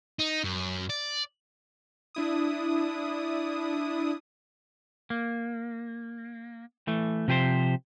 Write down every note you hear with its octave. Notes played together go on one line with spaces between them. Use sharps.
D#4
F#2
D5
D4 E4 D#6
A#3
E3 A3
C3 F3 G4 B4 C5